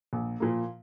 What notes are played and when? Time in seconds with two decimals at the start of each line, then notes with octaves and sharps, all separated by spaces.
0.13 A#1
0.40 A#2 F3 A#3